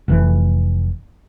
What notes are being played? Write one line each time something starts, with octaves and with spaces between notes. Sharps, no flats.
F1 E3